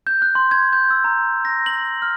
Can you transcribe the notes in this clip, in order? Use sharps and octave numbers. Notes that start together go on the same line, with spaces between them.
G6
F#6
C6
G#6
G6
E6
A#5
A#6
F#7
F6